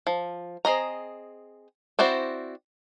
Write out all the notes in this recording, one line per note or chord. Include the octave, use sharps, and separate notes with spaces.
F3
C4 G#4 D#5 A#5
C4 E4 F#4 C5 D5